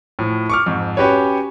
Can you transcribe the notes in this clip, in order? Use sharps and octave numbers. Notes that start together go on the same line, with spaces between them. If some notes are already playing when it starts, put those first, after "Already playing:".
A2 F3
C#6 D6 F6
F2 G#2
C#4 F#4 G4 B4 C#5